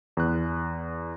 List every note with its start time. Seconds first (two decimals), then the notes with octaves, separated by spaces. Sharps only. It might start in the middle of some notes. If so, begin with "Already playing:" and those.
0.17 E2 F#6